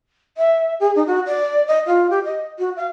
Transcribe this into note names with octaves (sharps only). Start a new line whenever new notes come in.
E5
G#4
D#4
F#4
D5
D#5
F4
G4
D#5
F#4
F5